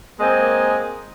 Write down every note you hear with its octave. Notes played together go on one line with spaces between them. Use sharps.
G#3 A#3 C4 D#5 G#5